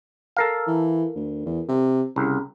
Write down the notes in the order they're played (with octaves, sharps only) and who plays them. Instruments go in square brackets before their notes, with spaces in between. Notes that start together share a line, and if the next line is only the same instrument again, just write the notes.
[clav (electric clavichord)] A4 A#4 F5
[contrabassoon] E3
D2
E2
C3
[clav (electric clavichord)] C2 [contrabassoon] C#3